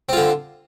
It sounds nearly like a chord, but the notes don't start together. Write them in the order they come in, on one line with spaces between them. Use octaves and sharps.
C4 F4 D3